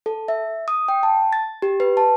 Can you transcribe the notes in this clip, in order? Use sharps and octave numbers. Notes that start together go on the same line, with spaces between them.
A4
E5
D#6
G5
A5
A6
G4
B4
A5